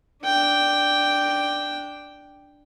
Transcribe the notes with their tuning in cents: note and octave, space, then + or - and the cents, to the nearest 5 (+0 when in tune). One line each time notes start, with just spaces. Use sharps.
D4 +0 G5 +0